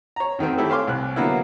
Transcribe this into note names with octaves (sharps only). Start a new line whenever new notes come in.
C#5 A#5
F#2 D#3 A3 C4
A3 C4 E4 G4 A4
C#5 F5 G#5 C6 D6
C2 F#6
D3 F#3 A#3 B3 E4